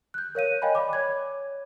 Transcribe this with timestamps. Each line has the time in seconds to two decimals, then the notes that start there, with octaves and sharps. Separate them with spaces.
0.14 F#6 G6
0.35 A#4 C#5 F5 D#7
0.62 C#5 D#5 F5 G5 G#5 B5
0.75 D5 B5 D6
0.93 C#5 G#6